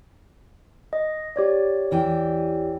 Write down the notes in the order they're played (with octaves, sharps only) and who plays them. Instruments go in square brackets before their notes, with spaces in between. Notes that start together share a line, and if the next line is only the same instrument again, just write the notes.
[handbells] D#5
G4 C#5 D5
[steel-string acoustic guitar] E2 E3 G5